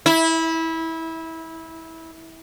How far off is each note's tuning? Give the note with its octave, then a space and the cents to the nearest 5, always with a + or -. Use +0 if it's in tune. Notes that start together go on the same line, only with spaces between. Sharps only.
E4 -20